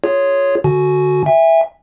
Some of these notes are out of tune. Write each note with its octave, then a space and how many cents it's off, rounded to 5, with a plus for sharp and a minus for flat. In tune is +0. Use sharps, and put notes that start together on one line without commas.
F4 +0 G#4 -5 C#5 +0
D3 +0 F#4 +0 G#5 +30
E5 +0 G#5 -35